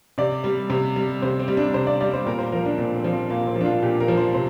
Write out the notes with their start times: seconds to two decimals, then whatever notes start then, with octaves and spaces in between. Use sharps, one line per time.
0.18 C3 D5
0.44 G3
0.70 C3
0.96 G3
1.22 C3 C5
1.39 C4
1.48 G3
1.57 D4
1.74 C3 C5
1.87 D5
2.01 G3 D5
2.14 C5
2.26 A#2 A#4
2.39 C5
2.52 F3 A#4
2.66 D4
2.78 A#2 C4
2.96 C4
3.04 F3
3.13 C4
3.30 A#2 A#3
3.47 C4
3.56 F3 D4
3.65 F4
3.82 A#2 G4
4.00 A#4
4.08 F3
4.17 C5
4.34 C3 C5